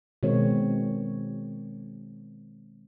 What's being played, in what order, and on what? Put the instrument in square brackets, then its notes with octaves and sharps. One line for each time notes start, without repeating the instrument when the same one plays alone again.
[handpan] B2 D#3 G#3 C4 C#5